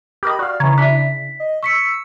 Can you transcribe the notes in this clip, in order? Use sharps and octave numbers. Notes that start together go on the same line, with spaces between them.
G4 A#4 D#5 B5
F#4 D5 F5
C#3 E3 C#5 A#5
D4 E4 B6
D#5
C#6 E6 B6 C#7